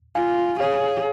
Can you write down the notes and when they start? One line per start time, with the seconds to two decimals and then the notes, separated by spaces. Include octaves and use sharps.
0.15 F4 F5 G#5
0.60 G#4 C#5 F5